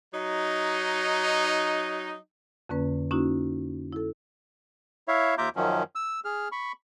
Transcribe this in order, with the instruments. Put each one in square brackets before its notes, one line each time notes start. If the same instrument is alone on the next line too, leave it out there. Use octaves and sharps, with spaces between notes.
[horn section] F#3 D#4
[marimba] F2 D3 A#3 C#4 B4
A#3 C#4 D#4 E4 F#4
E4 A4
[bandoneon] E4 C#5 E5 F5
D#2 F4 E5 A#5 D6 G6
F#2 D#3 F3 F#3 C#4
E6
G#4 F6
B5 C#6